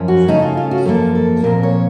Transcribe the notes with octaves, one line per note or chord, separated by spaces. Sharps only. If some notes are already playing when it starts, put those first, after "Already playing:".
Already playing: F#2 F3 C#4
F#4
C#3 A3 C#4 D#4
F4
F4
F#4
F#2 F3 A#3 A4
A4
A#2 F3 C4 A#4
C#5